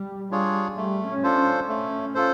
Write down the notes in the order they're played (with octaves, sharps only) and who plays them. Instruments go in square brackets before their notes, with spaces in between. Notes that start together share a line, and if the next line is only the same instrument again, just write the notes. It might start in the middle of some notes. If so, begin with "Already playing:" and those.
Already playing: [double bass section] G3
[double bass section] G3 [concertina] D4 F4 G#4 C#5
[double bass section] G3 [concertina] A3
[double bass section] C#4
[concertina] D4 F4 A4 C5
[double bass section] C#4
[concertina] A3
F4 A4 C5